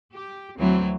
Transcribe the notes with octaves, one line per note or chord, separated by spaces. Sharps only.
G4
D2 E3 F#3 C4